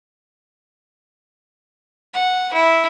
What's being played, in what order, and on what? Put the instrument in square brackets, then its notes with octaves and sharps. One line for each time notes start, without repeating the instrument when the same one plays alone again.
[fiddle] F#5
E4